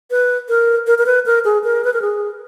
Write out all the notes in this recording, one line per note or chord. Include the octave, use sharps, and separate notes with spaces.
B4
A#4
A#4
A#4
B4
A#4
G#4
A#4
B4
A#4
G#4